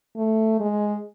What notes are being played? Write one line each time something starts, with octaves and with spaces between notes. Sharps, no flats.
A3
G#3